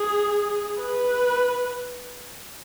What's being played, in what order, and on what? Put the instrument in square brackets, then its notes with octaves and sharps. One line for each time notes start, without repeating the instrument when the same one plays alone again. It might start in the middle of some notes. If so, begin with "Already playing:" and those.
Already playing: [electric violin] G#4
B4